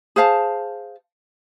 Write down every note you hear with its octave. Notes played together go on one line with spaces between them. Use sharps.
G#4 C5 F5 A5